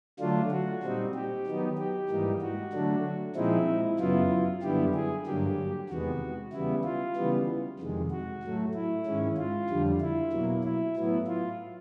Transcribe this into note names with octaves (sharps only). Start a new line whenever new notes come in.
D3 F#3 A3 D4 F4
F#4
A#2 G3 C4 D#4
G4
D#3 F#3 B3 D#4
G4
G#2 E3 G3 A#3 D#4
F#4
D3 F#3 A3 D4
A#2 F3 G#3 C4 D#4 E4
F#2 C#3 F#3 B3 E4 F4
F#2 D3 G3 B3 E4 G4
G#4
G2 D3 F#3 A#3 G4
E2 C3 D#3 G#3 B3 F#4
C#3 E3 G3 B3 E4
F4
C#3 E3 G3 B3
F2 C3 D#3 G#3
F#4
A2 F#3 A3
E4
G#2 D#3 G#3 C#4
F4
F2 D3 G3
E4
B2 F#3 A#3
E4
A2 F#3 B3 E4
F4